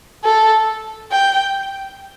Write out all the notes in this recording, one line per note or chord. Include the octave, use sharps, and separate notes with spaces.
A4
G5